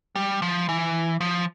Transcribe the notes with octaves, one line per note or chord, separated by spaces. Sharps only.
G3
F3
E3
F3